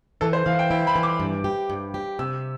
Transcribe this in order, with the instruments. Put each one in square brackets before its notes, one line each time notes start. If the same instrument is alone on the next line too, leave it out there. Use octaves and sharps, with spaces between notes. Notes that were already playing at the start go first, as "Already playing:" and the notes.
[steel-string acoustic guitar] E3 [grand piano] A4
[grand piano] C5
[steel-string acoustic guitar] E3 [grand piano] F5
[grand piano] G5
[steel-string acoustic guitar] E4 [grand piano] G5
[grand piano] B5
[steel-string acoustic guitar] E3
[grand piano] D6
[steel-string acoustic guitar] G2
G4
G2
G4
[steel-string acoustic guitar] C3 [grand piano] E6